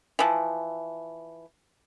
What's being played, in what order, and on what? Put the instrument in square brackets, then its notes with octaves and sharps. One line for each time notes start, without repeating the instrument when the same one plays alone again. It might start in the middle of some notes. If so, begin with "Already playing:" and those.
[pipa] E3 F3